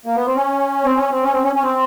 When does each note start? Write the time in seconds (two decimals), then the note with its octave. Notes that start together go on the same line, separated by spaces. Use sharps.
0.06 A#3
0.16 B3
0.26 C4
0.35 C#4
0.85 C4
0.97 C#4
1.11 C4
1.23 C#4
1.33 C4
1.43 C#4
1.55 C#4
1.63 C4